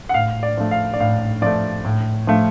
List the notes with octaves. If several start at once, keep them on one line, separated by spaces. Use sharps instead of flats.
F#5
A2 F5
D5
F3 A3
F5
D5
A2 F5
F3 A3 D5
A2
F3 A3